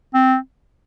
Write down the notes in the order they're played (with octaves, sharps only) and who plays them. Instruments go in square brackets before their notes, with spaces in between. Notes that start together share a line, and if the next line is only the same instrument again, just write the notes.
[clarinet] C4